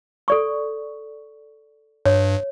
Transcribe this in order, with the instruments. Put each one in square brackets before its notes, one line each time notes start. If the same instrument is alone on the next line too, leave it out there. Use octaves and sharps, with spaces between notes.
[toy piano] A4 D5 C#6
[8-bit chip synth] G2 [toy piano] C#5